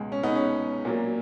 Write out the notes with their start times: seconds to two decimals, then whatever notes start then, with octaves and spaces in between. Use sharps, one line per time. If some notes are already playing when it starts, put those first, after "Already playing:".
Already playing: C#2 B2 G#3
0.12 C#4
0.23 B3 D#4
0.35 C#4
0.85 A#2 F#3 A#3